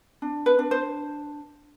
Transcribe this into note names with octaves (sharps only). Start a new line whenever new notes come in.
D4
B4
D4
C5